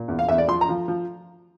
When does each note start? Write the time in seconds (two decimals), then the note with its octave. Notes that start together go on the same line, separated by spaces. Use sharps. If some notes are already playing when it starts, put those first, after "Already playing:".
Already playing: A#2
0.08 E2
0.19 F5
0.29 E2 E5
0.38 D5
0.48 F3 C6
0.61 A#5
0.69 F3
0.88 F3